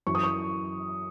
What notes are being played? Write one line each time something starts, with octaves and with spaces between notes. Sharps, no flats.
F#2 E3 C#6
D#6
C#6